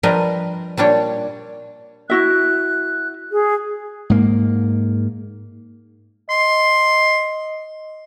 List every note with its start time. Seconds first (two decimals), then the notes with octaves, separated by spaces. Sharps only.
0.03 F3 G3 D4 A#4 B4 D#5
0.77 A#2 G3 D4 C#5
2.10 E4 F#4 E5 F#6
3.32 G#4
4.10 G#2 A#3
6.30 D#5 C6